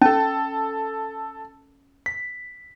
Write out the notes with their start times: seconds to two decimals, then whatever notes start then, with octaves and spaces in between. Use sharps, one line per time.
0.02 C#4 A4 A5
2.06 B6